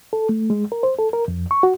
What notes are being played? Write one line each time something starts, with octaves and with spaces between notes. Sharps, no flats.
A4
A3
G#3
A#4
C5
A4
A#4
F2
C#6
F#4